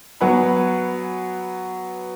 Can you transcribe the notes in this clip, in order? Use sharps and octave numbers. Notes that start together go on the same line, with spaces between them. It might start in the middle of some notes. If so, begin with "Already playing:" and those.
F#3 B3 F#5 G#5 B5